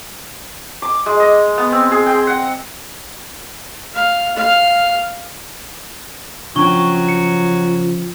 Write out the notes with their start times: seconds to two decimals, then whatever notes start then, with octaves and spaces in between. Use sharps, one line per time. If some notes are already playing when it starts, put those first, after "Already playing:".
0.82 D6
1.06 G#3
1.20 D#5
1.58 B3
1.72 C4
1.92 G#4
2.06 G5
2.27 F#5
3.95 F5
4.37 F5
6.56 C#3 F3 F#3 C#4 D4 G5 C#6 G7
7.09 C#7